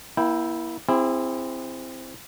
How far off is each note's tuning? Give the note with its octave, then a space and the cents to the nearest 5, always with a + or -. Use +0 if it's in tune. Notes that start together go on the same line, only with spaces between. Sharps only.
A#3 +40 E4 +0 G5 +0
C4 +0 E4 +10 G#4 -30